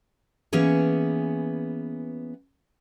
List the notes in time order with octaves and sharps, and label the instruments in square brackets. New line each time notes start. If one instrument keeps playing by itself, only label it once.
[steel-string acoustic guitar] E3 A#3 B3 C#4 G#4 C#5